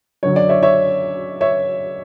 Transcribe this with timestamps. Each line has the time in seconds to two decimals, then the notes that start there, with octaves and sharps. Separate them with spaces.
0.23 F#2 D3 F#3 C#5
0.36 D5
0.49 C#5 E5
0.63 C#5 E5
1.41 C#5 E5